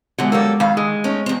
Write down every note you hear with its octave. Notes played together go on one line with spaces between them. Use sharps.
E2 B2 D3 F#3 G#3 F#5
D3 F#3 G3 A#3 A4 E6
F2 D#3 F5 B5 E6
G#3 D#6
A3 C#4 D#4
E2 C4